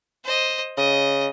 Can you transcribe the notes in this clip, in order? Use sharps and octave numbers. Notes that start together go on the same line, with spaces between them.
C5 D#5
C#3 D#5